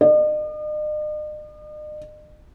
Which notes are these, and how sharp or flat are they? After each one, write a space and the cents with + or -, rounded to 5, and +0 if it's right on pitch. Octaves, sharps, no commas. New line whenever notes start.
D#5 -45